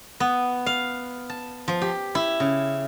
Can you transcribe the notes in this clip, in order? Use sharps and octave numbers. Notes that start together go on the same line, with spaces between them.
B3
F5
A5
F3
G4
E4
C#3